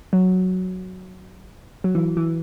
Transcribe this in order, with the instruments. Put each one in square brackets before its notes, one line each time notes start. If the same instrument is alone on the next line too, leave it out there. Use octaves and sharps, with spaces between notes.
[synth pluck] F#3
F#3
E3
E3